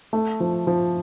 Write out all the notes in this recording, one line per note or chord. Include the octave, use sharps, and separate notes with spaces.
A3
F3
F3